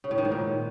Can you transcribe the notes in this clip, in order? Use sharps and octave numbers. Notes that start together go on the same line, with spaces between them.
C#3
A2
D#3
G#2
A#2